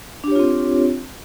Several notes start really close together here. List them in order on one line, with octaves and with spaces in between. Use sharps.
D4 G4 C#5 F4 C4